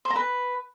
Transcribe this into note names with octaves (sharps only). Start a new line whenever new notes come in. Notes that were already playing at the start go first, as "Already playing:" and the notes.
C5
A#5
B4